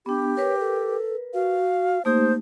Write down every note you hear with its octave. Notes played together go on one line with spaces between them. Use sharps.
B3 D4 G4
A#4 B4 C#5
A4
F#4 F5
A3 A#3 D#4 G4 C5